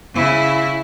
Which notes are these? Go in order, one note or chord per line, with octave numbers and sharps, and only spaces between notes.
C#3 E4